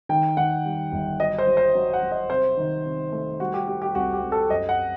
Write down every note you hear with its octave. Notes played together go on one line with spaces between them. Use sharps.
D#3 G5
D#3 F#5
G3
G1
F#3 D#5
C5
F#3
C5
F#3
F#5
F#3
D#5
C3 C5
D#3
C3
A3
G3 F#4
G4
G3 G4
G4
C2 F#4
G4
C2
A4
F#2 D#5
F#5